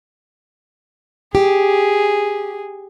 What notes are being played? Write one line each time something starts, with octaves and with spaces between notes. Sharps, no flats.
G4 G#4